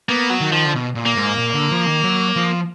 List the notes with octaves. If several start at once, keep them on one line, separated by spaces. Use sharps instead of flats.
A#3 B3
F#3
D#3
F3
D3
B2
A#2
A#3
G#2
A#2
D3
F3
D#3
F#3
F3